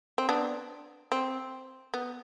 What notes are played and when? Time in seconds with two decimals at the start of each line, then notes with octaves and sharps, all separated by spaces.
0.18 C4
0.29 B3 D4
1.12 C4
1.94 B3